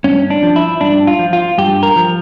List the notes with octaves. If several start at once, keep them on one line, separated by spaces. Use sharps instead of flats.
G2 C#4
D4
F3
E4
G2 D4
F4
F3
F4
G2 G4
A#4
F3